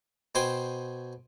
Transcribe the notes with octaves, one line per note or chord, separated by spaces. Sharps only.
B2 C5 G5 G#5